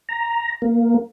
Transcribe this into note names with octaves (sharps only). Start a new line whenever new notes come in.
A#5
A#3